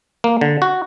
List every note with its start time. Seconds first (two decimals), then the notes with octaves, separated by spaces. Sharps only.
0.24 A#3
0.41 D3
0.62 F#4